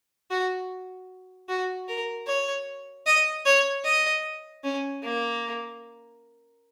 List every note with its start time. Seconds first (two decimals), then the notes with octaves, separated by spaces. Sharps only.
0.31 F#4
1.49 F#4
1.88 A#4
2.27 C#5
3.06 D#5
3.46 C#5
3.85 D#5
4.64 C#4
5.03 A#3